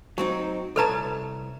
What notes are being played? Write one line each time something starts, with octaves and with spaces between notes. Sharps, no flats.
F#3 C4 D#4
C2 A4 B4 C#5 A5 A#5